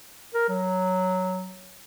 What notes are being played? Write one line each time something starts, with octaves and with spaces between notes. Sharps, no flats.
A#4
F#3